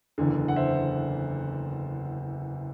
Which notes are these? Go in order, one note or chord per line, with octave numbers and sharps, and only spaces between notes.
F#1 E2 D3
F#5
C5 E5